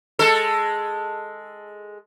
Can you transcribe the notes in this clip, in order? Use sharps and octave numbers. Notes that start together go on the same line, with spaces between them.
G#3 A4